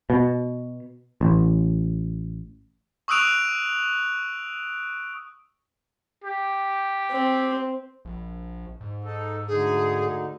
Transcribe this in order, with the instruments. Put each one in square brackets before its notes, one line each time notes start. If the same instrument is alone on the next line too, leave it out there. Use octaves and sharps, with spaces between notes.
[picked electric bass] B2
A1
[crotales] C#6 D#6 E6 F#6 D7 F7
[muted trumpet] G4
[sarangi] C4
[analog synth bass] A#1
G#2
[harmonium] D#4 A4
[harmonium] D2 D3 D#4 [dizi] G#4